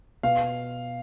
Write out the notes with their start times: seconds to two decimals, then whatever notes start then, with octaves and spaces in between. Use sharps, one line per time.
0.23 B2 F5